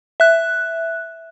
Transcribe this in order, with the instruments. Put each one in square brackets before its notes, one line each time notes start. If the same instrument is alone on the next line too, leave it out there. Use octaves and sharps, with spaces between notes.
[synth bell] E5 F#6